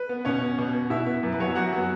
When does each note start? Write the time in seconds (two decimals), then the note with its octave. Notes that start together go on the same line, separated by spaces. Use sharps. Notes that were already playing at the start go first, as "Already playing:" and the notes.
Already playing: B4
0.09 B3
0.25 B2 C#4 C#5
0.41 B3
0.58 B2
0.74 B3
0.90 B2 E4 E5
1.06 B3
1.23 F#2
1.32 B4
1.40 F#3 B3 C#5
1.48 E5
1.55 F#2 F#4 F#5
1.73 F#3 B3